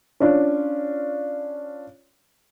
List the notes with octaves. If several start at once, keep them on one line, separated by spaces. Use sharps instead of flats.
C#4 D4 F4